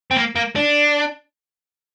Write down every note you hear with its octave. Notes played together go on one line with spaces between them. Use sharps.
C4
A#3
A#3
D4